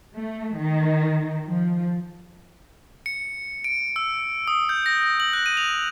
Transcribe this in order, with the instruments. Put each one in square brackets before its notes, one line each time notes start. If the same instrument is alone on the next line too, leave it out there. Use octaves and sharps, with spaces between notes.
[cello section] A3
D#3
F3
[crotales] C#7
D7
E6
D#6
G6
A#6
F#7
F#6
D#7
F7